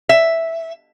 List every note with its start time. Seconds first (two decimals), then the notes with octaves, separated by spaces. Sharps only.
0.09 E5